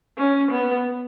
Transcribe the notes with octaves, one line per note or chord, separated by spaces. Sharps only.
C#4
B3